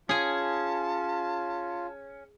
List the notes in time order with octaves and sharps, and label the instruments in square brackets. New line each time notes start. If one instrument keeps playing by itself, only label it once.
[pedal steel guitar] C#4 [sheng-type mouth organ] F4 [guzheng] G#4 G#5 [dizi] A5